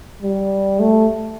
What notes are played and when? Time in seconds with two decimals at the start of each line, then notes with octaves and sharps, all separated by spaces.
0.22 G3
0.80 A3